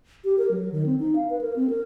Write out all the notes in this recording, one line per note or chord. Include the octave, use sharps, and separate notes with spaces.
G4
A#4
F#3
D#3
C4
D#4
F5
B4
A#4
C4
A#4